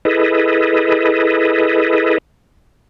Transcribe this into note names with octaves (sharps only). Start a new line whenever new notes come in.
E4 G#4 A4 B4 D#5